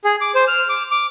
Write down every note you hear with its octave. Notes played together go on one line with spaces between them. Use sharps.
G#4
D6
C5
F6
D6
D6